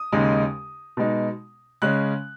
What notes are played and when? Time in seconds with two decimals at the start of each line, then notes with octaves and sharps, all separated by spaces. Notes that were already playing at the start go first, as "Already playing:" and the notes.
Already playing: D#6
0.12 D#2 C#3 G#3 D#4
0.97 B2 G#3 D#4
1.82 C#3 G#3 C#4 F#6